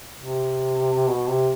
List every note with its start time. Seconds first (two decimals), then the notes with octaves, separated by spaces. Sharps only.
0.19 C3
1.09 B2
1.29 C3